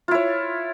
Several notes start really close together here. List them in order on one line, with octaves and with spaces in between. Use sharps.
F4 E4 C#5